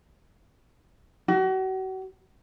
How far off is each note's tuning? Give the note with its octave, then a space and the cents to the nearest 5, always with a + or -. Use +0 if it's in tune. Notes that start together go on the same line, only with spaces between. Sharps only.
F#4 +35